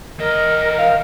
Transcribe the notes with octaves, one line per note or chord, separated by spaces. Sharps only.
E3 A#4 D#5
F5